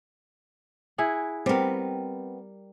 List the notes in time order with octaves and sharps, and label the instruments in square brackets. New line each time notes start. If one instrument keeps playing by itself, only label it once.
[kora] E4 G#4 F#5
[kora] G3 A#4 [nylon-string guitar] B3 C4